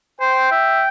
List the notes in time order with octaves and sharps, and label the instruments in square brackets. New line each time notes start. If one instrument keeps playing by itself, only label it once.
[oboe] C5 [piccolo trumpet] G5
[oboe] E5